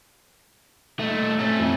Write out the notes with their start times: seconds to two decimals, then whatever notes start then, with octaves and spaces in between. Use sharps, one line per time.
0.99 A#2 A3 D#4
1.39 C4 C#4 A6
1.59 F2